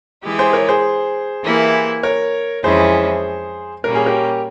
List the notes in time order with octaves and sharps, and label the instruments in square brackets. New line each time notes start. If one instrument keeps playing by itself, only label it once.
[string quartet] E3 G#3 E4 G4
[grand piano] G#4 C5
A#4 C#5
G#4 C5
[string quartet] E3 A#3 E4 G4
[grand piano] A#4 C#5
[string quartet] F2 E3 G#3 C#4 E4 [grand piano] G#4 C5
[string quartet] A#2 G3 A#3 C#4 [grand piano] A#4
[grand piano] G#4
G4 A#4